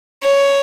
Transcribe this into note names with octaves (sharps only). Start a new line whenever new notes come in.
C#5